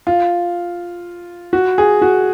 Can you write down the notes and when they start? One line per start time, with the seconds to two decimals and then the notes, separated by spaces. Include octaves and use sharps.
0.07 F4
1.53 F#4
1.78 G#4
2.02 F#4